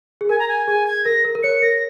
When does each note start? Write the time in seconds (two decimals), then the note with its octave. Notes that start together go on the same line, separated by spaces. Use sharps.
0.21 G#4
0.29 A#4 G#5
0.39 A#5
0.48 G#5
0.67 G#4 G#5
0.87 G#6
1.05 A#4 A#6
1.25 A#4
1.35 A#4
1.43 C#5 C#7
1.62 A#4 A#6